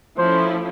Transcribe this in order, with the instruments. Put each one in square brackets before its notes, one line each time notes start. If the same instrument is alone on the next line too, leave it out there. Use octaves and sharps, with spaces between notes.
[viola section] F3 A3 C#4 E4 [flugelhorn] C5